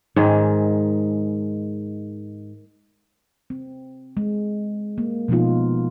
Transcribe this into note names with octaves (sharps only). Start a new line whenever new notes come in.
G#2 D#3 G#4
C4
G#3
A#3
B2 F3 G#3 B3 D#4 F4